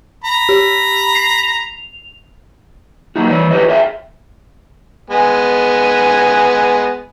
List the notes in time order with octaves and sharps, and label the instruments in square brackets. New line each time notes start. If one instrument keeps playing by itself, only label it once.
[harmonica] A#5 B5
[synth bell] G4
C7
F7
[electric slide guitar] F#3 A#3 D#4 F#4
E3 C#5 D5
F#4 G4 B4 C#5 D#5
G#4 C#5 E5 F5 G5
[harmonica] G#3 B3 G#5